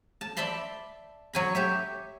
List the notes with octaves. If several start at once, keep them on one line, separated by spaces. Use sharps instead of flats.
A5
D5 E5 A5 B5 C6
F#3 G#5 B5
G4 C#5 E5